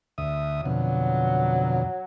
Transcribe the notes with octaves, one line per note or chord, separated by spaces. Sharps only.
D2 E5 D#6
F2 B2 D3 F#3